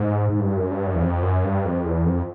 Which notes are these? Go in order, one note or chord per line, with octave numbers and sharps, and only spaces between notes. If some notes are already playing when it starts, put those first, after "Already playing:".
Already playing: G#2
G#2
G2
F#2
G2
F#2
E2
F2
F#2
G2
F2
E2
F2